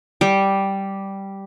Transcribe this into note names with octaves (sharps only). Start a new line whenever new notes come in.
G3